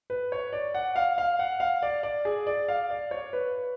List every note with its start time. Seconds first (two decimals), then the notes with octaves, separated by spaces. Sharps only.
0.10 B4
0.32 C#5
0.53 D5
0.74 F#5
0.96 F5
1.18 F5
1.39 F#5
1.60 F5
1.83 D5
2.03 D5
2.25 G#4
2.47 D5
2.68 F5
2.90 D5
3.11 C#5
3.33 B4